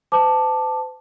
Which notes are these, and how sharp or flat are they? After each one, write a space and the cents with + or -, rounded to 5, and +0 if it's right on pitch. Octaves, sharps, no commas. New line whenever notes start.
C5 -45 A5 +0 D6 +15